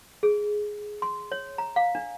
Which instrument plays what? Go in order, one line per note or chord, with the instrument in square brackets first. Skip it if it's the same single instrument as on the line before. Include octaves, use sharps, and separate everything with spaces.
[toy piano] G#4
C6
C#5
A#5
F5
D4